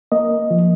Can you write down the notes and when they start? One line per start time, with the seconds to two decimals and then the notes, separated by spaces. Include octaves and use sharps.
0.12 A#3 D#5
0.51 F3